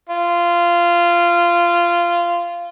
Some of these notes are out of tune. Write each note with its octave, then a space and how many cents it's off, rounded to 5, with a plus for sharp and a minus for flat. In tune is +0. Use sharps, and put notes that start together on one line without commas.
F4 -15